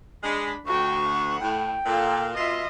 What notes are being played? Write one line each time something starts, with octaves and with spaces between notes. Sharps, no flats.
G#3 D4 B5
D2 F#4 G5 C#6
F#5
A2 G5
A#2 A4 F5
B2 F4 D#5 E5